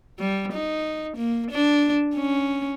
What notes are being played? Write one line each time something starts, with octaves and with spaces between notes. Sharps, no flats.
G3
D#4
A#3
D4
C#4